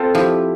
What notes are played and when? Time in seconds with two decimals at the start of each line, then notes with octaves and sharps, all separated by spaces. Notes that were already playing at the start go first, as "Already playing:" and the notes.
Already playing: C4 F4 A4
0.15 F3 E4 G4